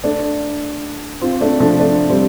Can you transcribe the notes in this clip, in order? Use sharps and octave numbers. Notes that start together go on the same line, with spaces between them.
A3 D4
C4 F4
A3 D4
F3 A3
A3 D4
G3 C4